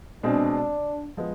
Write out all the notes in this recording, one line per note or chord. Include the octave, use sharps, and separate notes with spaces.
B2 G#3 C4 D4 G#4
F3 G#3 B3